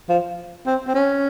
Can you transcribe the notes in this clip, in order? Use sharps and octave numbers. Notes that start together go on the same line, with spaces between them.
F3
C4
C4
C#4